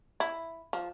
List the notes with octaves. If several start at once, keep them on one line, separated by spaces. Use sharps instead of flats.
E4
F3